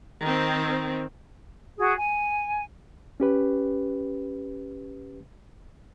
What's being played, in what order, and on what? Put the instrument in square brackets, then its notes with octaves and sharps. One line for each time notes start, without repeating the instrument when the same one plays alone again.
[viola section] D#3 C4
[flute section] F#4 G#4
G#5
[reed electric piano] C#4 G4 B4